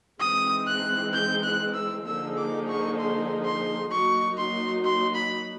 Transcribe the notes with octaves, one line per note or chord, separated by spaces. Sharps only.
E3 G#3 C4 D#4 D#6
F#6
G6
F#6
E6
D3 F3 A#3 D#4 G#4 E6
D6
C#6
C6
C6
F#3 A#3 D#4 F#4 C#6
C6
C6
B5